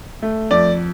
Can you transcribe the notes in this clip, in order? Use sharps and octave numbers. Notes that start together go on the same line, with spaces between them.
A3
F2 D5